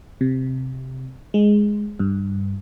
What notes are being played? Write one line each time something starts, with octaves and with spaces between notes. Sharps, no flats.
C3
G#3
G2